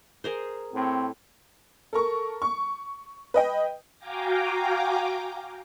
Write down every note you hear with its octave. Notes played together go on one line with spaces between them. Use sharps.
G#4 A#4 C5
A2 C4
A4 A#4 C#6
C#6
B4 D#5 G5
F#4 F5 G5 G#5 A#5 D6